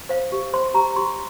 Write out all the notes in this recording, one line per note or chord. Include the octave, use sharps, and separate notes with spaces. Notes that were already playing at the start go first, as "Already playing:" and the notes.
C5 F5
G4
C5 C6
G4 A#5
G4 C6